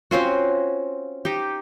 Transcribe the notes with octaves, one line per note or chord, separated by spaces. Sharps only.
C4 C#4 F4 F#4
D#4 G4